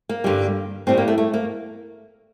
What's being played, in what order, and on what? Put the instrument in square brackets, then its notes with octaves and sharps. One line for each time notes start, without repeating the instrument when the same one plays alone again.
[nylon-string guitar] A#3
G2 D3 G3
A2 G3 C4
A#3
A3
A3
A#3